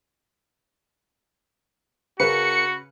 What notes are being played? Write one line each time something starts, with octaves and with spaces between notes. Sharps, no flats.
C#3 C#4 F#4 G#4 A#4 B4 C#7